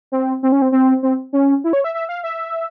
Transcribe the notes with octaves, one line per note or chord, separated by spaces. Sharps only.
C4
C4
C#4
C4
C4
C4
C#4
E4
C#5
E5
E5
F5
E5